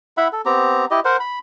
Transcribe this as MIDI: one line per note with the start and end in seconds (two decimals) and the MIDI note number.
0.17 0.28 64
0.17 0.28 76
0.17 0.28 78
0.17 0.28 83
0.32 0.41 69
0.45 0.85 59
0.45 0.85 60
0.45 0.85 67
0.45 0.85 82
0.91 1.00 64
0.91 1.00 67
0.91 1.00 75
1.05 1.17 70
1.05 1.17 72
1.05 1.17 78
1.20 1.39 83